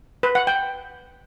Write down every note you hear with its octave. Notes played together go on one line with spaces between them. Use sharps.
B4
F#5
G5